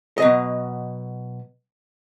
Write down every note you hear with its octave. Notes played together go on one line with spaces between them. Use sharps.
B2 F#3 D#5